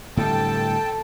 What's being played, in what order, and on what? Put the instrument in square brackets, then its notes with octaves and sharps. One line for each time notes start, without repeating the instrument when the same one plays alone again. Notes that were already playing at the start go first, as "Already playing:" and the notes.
[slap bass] A2 D3 G3 [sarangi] A4 [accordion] G5 A5